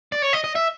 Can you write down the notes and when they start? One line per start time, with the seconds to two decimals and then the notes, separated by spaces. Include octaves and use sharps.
0.12 D5
0.22 C#5
0.33 D#5
0.44 D#5
0.56 E5